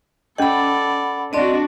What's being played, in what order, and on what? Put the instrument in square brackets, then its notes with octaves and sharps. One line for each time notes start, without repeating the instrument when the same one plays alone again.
[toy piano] C#4 D#5 [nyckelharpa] A4 D5 [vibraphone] F#5 B5
[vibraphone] C4 D5 D#5 [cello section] D4 F#4